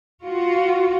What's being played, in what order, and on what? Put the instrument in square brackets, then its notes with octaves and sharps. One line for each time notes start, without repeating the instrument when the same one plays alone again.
[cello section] F4 F#4